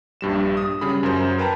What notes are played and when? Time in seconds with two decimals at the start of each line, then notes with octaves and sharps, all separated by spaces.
0.21 A#1 G2 G3 E7
0.57 D#6
0.81 C#3 G3 G#4 B5
1.03 F#2 C#3 A#4 C5
1.38 A#4 B4 G5 A5 A#5